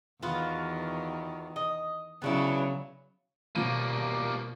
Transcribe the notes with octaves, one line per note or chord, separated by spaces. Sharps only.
E2 D#3 B3 F4 F#4
D#5
C#3 F#3 B3 D4 E4
B2 F3 G3 A#3 D#7